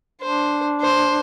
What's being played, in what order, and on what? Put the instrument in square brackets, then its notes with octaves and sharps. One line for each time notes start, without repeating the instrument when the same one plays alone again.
[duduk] D4 [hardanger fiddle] C5
[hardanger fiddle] C5